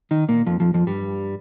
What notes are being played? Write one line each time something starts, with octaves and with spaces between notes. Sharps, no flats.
D#3 D#4
A#2 A#3
F2 F3
F2 F3
F2 F3
G2 G3